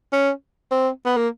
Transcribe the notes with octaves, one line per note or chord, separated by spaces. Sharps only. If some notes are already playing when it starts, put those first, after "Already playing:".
C#4
C4
B3
A#3